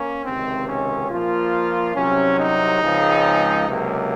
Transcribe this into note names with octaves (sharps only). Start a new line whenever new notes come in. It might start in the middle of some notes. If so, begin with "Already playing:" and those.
Already playing: A#3 C#4
C#2 C3 D#3 C4
C#4
A#2 F3 A#3 F4
C2 C3 F#3 C#4
D#4
C#2 C#3 F3 G#3 C4
C#2 C3 F#3 A#3